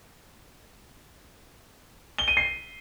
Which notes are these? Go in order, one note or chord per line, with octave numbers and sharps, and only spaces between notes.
G7
D#7
C7